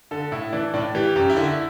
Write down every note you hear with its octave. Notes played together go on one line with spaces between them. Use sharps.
D3 A4
A2 E4
E3 D4
A2 D4
E3 G4
F#2 G4
E4
D3
E4